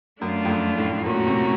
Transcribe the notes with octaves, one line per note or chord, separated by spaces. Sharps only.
F#2 A3 D4 F4
F2
F#2
A2
A#2 A3 C#4 F#4 A#4
C3